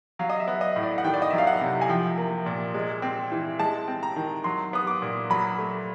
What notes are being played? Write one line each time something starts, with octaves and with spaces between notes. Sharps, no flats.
F#3 F5
D#5
E5
B3
D#5
A2
D5
F#5
D#3 G5
D5
D#5
F#3 E5
F5
F#5
C3
G#5
F3 G5
A#3
A#2
G#3
C4
E3
G#3 A5
C4
A#5
D#3
F#3 C6
B3 D#6
D6
A#2
F#3 B5
A3